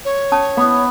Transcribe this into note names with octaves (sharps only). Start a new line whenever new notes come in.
C#5
C#4 A5 D#6
B3